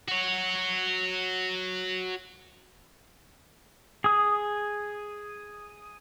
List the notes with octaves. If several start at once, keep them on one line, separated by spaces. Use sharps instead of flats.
F#4 C#5
G#4 D#6